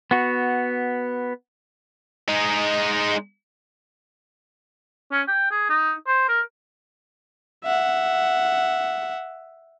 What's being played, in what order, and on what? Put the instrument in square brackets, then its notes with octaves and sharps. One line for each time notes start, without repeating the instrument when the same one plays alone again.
[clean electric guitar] B3 F#4
[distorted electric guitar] G#3 D#4
[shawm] C#4
G5
G#4
D#4
C5
A#4
[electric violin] E5 F#5